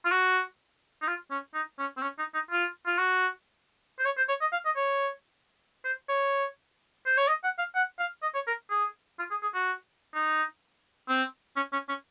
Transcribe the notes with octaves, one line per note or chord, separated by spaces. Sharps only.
F4
F#4
D#4
F4
C#4
D#4
C#4
C4
C#4
D#4
D#4
F4
F4
F#4
C5
C#5
C5
C#5
D#5
F5
D#5
C#5
C5
C#5
C5
C#5
D#5
F#5
F5
F#5
F5
D#5
C#5
A#4
G#4
F4
G#4
G#4
F#4
D#4
C4
C#4
C#4
C#4